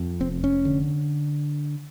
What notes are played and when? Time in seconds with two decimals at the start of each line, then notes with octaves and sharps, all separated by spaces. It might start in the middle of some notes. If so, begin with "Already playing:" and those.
Already playing: F2
0.20 F1 C4
0.44 C#4
0.65 D3